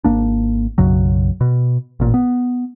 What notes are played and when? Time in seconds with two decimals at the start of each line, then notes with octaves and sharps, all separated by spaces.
0.04 G#1 A2 A#3 D4
0.78 B1 F#2 C#3 F#3
1.41 B2
2.00 A1 A#2
2.14 B3